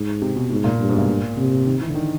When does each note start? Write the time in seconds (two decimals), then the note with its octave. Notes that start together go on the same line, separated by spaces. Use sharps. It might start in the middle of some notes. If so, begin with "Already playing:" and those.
Already playing: G#2
0.22 C3
0.36 B2
0.50 G#2 B2
0.64 A#2
0.79 G2
0.89 G#2
0.94 B2
0.98 A#2
1.37 C3
1.66 D#3
1.81 E3
1.89 D3
1.95 D#3